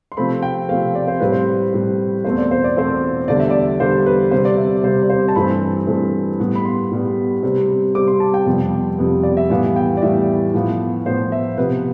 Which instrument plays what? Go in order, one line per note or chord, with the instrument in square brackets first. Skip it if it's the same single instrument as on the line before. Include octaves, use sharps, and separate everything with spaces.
[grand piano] C6
C3 F3 A3 C4 B5
G5
C3 F3 A3 C4 F5
D5
C5
A2 G3 C4 B4
C5
A2 G3 C4
E2 B2 A3 C4 C5
D5
C5
D5
E2 B2 A3 C4 C5
E2 D3 G3 D5
E5
D5
E2 D3 G3 C5
B4
C3 G3 C4 C5
D5
E5
C3 G3 C4 C5
D5
C5
A5
G2 E3 A3 C4 B5
G2 E3 A3 C4
A2 G3 B3
B5
C6
A2 G3 B3
C3 G3 C4
C3 G3 C4 D6
C6
A5
G5
F2 C3 G3 B3
F2 C3 G3 B3
D5
E5
A2 E3 G3 B3 F5
G5
D5
A2 E3 G3 B3 E5
A2 F3 B3
A2 F3 B3 C5
E5
C3 F3 B3 B4